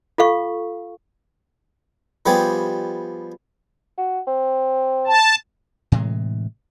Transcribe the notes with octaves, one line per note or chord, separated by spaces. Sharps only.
F4 A4 F5 C#6
F3 G3 B3 G4 G#4
F#4
C4
A5
A2 C3 E3 G#3